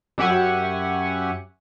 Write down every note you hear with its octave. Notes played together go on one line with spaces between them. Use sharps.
F#2 G4 E5 F#5 G#5 C#6